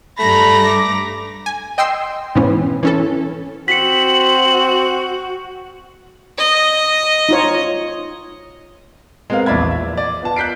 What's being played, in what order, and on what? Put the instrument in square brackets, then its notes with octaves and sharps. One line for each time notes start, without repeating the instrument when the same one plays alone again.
[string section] G2 A#5 A#6 [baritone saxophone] A3 [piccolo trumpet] B5
[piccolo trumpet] D6
[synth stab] G#5
D#5 G5 C6 E6 C7
G#2 B2 E3 B3 C#4
E3 C#4 A4
[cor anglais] C4 [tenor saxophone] F#4 [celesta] B6 C#7 [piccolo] F#7
[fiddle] D#5
[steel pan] D#4 F4 C#5
[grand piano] G#3 B3 C4 A#4 F5
A#1 E2 D5 E5 B5 G#6
E5
D5 D#5
B3 F4 A5
F#6 G6 B6 C7 D7